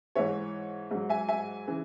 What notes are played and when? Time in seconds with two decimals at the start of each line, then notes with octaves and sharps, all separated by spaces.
0.15 G#2 E3 C#5 E5
0.91 G#2 F#3
1.09 E5 G#5
1.29 E5 G#5
1.67 C#3 E3